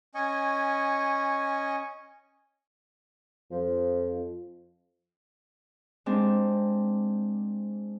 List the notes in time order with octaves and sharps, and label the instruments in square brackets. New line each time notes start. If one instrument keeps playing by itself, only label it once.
[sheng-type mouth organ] C#4 D#5 G#5 C#6
[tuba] F2 [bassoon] F3
[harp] G#3 C4 D4